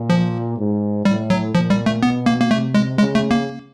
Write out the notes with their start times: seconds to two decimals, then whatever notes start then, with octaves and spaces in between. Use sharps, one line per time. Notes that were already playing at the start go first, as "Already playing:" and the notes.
Already playing: A#2
0.10 F3
0.58 G#2
1.05 A2 G3
1.30 F#3
1.55 A#2 F3
1.70 G3
1.86 A3
2.03 B2 B3
2.26 A#3
2.41 A#3
2.51 C3 A3
2.74 G#3
2.98 C#3 G#3
3.15 A3
3.31 A#3